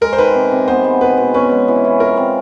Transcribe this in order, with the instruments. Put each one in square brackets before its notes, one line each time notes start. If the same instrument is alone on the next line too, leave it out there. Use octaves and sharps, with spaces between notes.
[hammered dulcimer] G#3 [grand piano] A#4
[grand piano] C5
[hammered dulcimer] D#3 [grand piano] B4
[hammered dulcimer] C3
C3
[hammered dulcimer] B3 [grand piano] C5
[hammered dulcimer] G#3
[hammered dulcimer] B2 [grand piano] B4
[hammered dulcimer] B2
[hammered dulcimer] C#4 [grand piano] B4
[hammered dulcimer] G#3
E3
E3
[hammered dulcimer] F4 [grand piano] A#4
[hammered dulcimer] C4